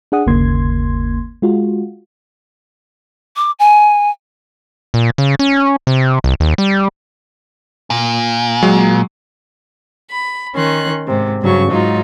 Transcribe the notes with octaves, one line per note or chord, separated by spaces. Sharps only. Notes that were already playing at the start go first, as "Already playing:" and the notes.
D4 G#4 F#5 D#6
G1 D#2 C#3 A#3 C6 G#6
G#3 F4 F#4
D6
G#5
A#2
C#3
C#4
C3
C2
D#2
G3
A#2
F#3 G#3
B5
D#3 C#4 C6 F#6
G#2 C3
G2 C#3 F#3 C#4 C#6
G#2 F#3 D#4 F4